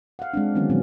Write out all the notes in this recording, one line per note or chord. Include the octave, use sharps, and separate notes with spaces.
F5 F#5
G#3 C4 D4
D3 D#3 F#3 B3 C#4
A#2 D#3 F3 F#3 B3 C4